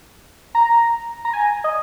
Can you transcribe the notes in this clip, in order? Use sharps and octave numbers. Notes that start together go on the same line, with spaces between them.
A#5
A#5
G#5
D#5